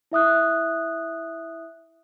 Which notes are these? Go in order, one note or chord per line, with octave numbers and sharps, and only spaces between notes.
E4 E5 D#6 F#6